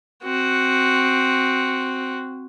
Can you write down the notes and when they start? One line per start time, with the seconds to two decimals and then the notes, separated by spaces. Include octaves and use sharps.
0.24 C4 F#4